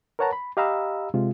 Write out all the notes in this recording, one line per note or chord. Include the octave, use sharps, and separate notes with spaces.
A#4 B4 C#5 F#5 A5 A#5
B5
G4 D#5 F5 A#5 B5 E6
C3 G#3 F4